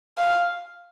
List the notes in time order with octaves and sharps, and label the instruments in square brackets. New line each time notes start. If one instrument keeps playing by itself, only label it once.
[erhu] F5